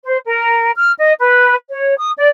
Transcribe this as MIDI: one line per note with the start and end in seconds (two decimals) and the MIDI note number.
0.06 0.18 72
0.25 0.71 70
0.75 0.92 89
0.98 1.13 75
1.20 1.55 71
1.70 1.95 73
1.98 2.11 87
2.17 2.28 74